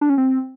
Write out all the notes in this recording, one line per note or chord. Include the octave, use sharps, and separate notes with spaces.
D4
C#4
C4